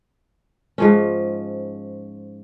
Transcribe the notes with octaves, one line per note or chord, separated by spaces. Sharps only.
G#2 F3 C#4